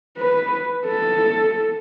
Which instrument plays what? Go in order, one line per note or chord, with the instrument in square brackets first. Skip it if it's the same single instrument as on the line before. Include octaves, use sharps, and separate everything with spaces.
[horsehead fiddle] B4
A4